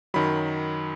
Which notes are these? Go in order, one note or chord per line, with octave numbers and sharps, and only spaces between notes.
F#2 D#3 F#3 B5